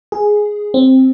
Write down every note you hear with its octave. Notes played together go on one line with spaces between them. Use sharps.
G#4
C4